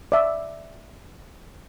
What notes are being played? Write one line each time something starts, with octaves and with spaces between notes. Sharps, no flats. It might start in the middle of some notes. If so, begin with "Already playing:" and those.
D5 E5